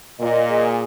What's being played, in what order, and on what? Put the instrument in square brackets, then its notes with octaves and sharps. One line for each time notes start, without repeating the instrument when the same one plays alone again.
[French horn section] A#2 [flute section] D#5
[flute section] G#4